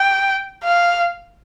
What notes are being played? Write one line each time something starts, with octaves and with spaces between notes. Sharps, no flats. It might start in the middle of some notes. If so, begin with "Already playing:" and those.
Already playing: G5
F5